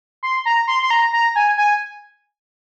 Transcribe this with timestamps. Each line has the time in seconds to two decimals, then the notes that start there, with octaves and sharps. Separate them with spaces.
0.23 C6
0.45 A#5
0.68 C6
0.82 C6
0.90 A#5
1.13 A#5
1.36 G#5
1.58 G#5